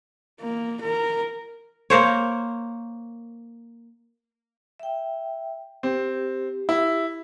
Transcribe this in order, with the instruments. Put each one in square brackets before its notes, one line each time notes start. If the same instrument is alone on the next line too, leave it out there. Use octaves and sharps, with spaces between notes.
[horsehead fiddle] A#3
A#4
[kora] A#3 A#4 C5 C#5
[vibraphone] E5 G5
[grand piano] C4 [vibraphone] G4
[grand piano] E4